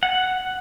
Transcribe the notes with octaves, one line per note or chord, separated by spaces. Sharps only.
F#5